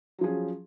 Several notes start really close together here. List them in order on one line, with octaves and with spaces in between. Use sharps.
F#3 F3 G#4 C#4